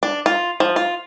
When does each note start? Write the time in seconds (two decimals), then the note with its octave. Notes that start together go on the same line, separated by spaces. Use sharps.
0.03 D4
0.26 F4
0.60 F3
0.76 F4